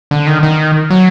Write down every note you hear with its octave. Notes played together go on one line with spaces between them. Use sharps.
D3
D#3
D#3
F#3